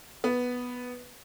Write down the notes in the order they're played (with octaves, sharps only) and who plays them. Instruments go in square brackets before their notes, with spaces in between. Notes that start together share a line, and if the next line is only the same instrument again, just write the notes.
[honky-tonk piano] B3